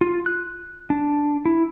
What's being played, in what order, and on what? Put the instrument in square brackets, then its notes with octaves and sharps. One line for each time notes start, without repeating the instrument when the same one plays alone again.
[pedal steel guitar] F4
F#6
D4
E4